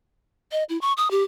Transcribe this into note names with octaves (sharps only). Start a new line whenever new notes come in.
D#5
E4
C#6
D#6
G4